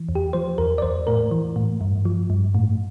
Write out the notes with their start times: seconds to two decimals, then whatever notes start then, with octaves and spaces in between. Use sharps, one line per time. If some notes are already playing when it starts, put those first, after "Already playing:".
Already playing: E3
0.09 E2
0.15 G4
0.33 F3 C5
0.58 E2 A#4
0.78 D5
0.82 E2 C5
1.07 A2 A#4
1.31 E3
1.56 A2
1.81 G2
2.05 F3
2.30 G2
2.55 A2